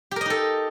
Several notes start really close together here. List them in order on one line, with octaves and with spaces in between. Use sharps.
G4 A#4 D#5 D#4 A4